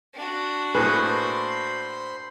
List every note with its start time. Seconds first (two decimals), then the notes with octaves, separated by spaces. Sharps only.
0.14 D4 F#4
0.75 A2 A#3 G#4 B4 C5 B5 C6